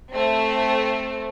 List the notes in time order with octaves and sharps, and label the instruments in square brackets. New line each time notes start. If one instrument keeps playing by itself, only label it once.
[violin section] A3 C4